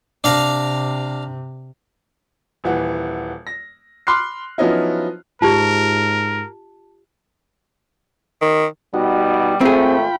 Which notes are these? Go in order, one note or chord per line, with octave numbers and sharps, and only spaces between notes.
C3 D4 F5 A#5
D#1 E3 F#5
A#6
B5 C6 D6 F6 F#6 C7
F3 F#3 B3 C#4 D#4 E4
G#2 F4 G4 A#4 A5
D#3
B2 G3 D#4 F#4
G#1 A3 C4 F4 G#4 G5 B5